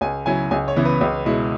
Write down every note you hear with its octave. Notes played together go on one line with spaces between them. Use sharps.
C#2 G#5
C#3 F#3 E4 G#5
C#2 G#5
C#5
C#3 E3 B3 E4
B4
C#2
B2 G#3 E4